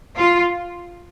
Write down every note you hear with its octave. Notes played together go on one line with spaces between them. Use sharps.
F4